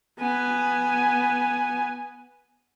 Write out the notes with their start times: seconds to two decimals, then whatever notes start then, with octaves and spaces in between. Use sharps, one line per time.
0.19 B3 G#5